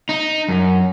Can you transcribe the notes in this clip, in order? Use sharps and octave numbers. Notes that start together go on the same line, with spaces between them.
D#4
F#2